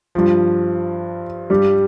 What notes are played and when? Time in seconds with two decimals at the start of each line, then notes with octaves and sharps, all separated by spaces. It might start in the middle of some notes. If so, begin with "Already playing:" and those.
0.15 G2 F3
1.50 G2 G3 G4